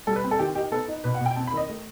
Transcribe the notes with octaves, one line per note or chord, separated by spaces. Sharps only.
G3 A4
B4
C4
A4
D#3 G4
D#4 G4
B3 A4
D#4
B2 B4
F#5
B2
G5
C4 A5
B5
D#3 D#5
A3